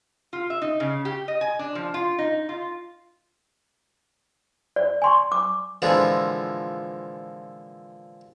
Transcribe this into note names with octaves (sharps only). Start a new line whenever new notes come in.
F4
E5
D#4
C#3
G4
D#5
G#5
D4
F3
F4
D#4
F4
D5
G#5 C6 C#6
D6
A#2 D3 E3 F3 G#3